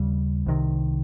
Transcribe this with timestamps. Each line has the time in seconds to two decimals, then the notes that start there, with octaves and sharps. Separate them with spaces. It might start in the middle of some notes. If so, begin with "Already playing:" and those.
Already playing: D#2 C#3 G3
0.46 C2 C3 D#3